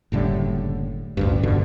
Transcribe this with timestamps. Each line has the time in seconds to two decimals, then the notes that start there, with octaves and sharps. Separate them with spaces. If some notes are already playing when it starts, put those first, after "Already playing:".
0.12 F#1 A2 D3 G3
1.17 A1 D2 G2
1.43 F1 G2 B2 D3